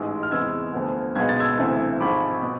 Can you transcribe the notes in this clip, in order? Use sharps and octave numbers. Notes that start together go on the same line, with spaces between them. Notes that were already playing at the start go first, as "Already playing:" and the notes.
Already playing: A1 G#2 G#3
F6
E2 C3 G#3 B3 E6 G#6
D2 D3 F3 B3
B1 B2 G#3 B3 G#6
A6
E6 G#6
D2 C3 E3 A3
G#1 G#2 F3 B5 D6
B2 B3